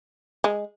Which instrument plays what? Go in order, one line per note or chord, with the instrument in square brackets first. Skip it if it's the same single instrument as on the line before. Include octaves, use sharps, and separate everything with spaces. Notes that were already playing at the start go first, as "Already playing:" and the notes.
[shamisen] G#3